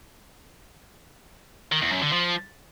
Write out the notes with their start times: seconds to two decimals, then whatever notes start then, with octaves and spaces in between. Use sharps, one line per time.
1.72 D#3
1.82 E2
1.92 F#2
2.02 D3
2.12 F3